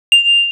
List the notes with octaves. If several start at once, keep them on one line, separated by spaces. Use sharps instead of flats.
F7